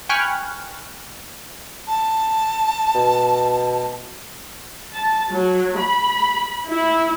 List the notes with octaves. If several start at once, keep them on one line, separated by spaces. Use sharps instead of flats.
G5 G#5 B5 C#6 F6 F#6
A5
B2
A5
F#3
B5
E4